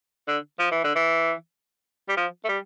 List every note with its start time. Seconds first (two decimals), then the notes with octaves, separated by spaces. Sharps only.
0.28 D3
0.59 F3
0.71 E3
0.84 D3
0.96 E3
2.09 G3
2.17 F3
2.45 A3
2.49 G3